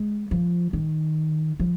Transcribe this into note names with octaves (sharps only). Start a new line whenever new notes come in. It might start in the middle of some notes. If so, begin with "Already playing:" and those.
Already playing: G#3
F3
D#3
F3